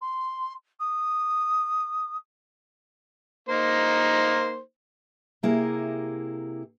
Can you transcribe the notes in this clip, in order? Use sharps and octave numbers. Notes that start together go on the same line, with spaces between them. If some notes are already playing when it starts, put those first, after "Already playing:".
C6
D#6
A#3 D#4 C5
C3 A#3 E4 G4 G#4 A#4